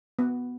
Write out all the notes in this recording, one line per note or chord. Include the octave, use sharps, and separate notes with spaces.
B3